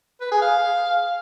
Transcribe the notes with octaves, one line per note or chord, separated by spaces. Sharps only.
B4
G#4
F5